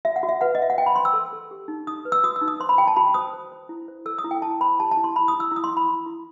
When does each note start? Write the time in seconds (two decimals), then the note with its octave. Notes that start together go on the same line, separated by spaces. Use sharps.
0.05 F#4 E5
0.16 F#5
0.23 F#4
0.29 E5
0.41 B4 F#5
0.55 D#5
0.60 F#4 E5
0.70 F#5
0.78 C5 G5
0.86 B5
0.95 C5 C6
1.05 E6
1.13 A4
1.33 A4
1.51 G4
1.68 D#4
1.87 D#4 D#6
2.05 B4
2.12 E6
2.24 F#4 D#6
2.36 E6
2.42 D#4
2.48 D#6
2.60 C5 C6
2.69 B5
2.78 F#4 G5
2.87 A5
2.96 F#4 B5
3.14 C5 D#6
3.33 C5
3.52 C5
3.69 E4
3.88 C5
4.06 A4 E6
4.18 D#6
4.24 E4
4.31 G5
4.42 E4 A5
4.60 C5 B5
4.79 G4 A5
4.91 A5
4.97 E4
5.04 C6
5.16 E4 B5
5.28 D#6
5.34 E4
5.40 E6
5.52 E4 D#6
5.64 C6
5.70 E4
5.77 B5
5.89 E4
6.06 E4